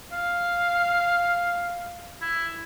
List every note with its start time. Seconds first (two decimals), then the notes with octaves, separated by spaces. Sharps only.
0.12 F5
2.22 E4